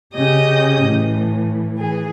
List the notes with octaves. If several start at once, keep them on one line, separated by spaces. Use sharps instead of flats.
C#3 C#4 G4 D#5 D#6 G6
A2 E3
E3 G#4